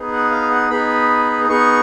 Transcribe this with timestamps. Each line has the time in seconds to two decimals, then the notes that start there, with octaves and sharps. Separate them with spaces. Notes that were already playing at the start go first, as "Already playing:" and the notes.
Already playing: B3 D#4 G#4
0.12 F#5
0.31 F5
0.51 F#5
0.70 B3 D#4 G#4 B5
1.49 B3 D#4 G#4 C#6